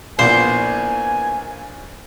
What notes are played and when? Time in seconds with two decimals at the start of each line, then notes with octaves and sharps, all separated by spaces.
0.19 A#1 A#2 A#3 B3 E4 C5 G#5